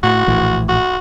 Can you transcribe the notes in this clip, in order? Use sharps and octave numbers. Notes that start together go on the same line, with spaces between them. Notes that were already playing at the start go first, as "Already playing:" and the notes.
A2 F#4
A#1 A2 E3
F#4